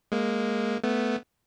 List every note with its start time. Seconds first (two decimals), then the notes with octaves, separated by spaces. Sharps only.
0.12 G#3 A#3
0.84 A3 B3